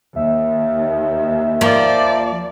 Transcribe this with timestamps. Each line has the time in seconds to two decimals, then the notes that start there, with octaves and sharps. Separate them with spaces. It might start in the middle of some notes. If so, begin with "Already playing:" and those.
0.16 D#2 E5
1.61 F3 A#3 D5